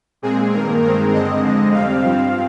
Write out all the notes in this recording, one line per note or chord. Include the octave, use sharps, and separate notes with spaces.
A#2 G#3 C4 G#4
G2 D#3 A#3 A#4
G2 D#3 G#3 C4 A#4
G2 D3 G#3 C4 D#5
F2 D3 G#3 C4
F2 C3 G3 C4 F5
G2 F3 C4